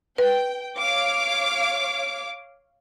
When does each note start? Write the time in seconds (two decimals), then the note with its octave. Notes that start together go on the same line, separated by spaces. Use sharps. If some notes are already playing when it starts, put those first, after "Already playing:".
0.18 B4 G5
0.78 C#5 F5 D6